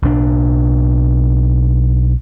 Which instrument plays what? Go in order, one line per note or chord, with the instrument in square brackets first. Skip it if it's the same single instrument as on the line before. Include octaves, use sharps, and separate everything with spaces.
[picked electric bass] B1 D4